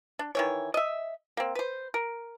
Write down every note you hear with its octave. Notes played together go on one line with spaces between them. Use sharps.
D4
D#3 E3 C#5
D#5 E5
A#3 C4
B4 C5
A#4